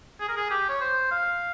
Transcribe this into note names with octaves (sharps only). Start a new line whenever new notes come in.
G#4
A#4
G#4
G4
C#5
C5
F5